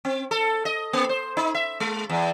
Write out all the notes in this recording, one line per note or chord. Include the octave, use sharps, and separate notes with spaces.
C4
A4
D#5
A#3
C5
D#4
E5
G#3
E2